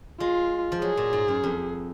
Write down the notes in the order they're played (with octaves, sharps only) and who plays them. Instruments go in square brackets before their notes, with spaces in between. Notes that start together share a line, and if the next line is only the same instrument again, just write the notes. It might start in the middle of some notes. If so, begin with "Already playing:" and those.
[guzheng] G#3 [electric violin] F4
[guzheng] F3
[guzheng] F#3 [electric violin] G#4
[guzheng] A#2
G#2
F#2
F2